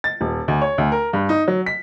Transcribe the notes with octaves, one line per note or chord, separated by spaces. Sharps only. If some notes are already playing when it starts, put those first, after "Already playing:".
A6
D#1
D2
C#5
D2
A#4
G2
D#4
F#3
B6